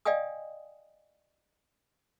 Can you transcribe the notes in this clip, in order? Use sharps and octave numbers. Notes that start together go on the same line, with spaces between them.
D5 D#5 F5 G5 G#5 D#6